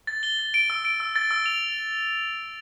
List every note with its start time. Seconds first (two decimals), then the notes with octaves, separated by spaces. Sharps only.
0.07 A6
0.23 G7
0.39 A6
0.54 D7
0.70 E6
0.85 D7
1.00 E6
1.16 A6
1.31 E6
1.46 F7